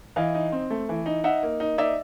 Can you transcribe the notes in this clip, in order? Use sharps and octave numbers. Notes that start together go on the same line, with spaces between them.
E3 D#5 F5
D#4
C4
A3
E3
D#4
D#4 E5 F#5
A#3
D#4
D#4 D5 E5